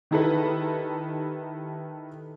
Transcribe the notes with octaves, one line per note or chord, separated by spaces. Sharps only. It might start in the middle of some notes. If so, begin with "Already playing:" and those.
D#3 D#4 E4 G4 A4 B4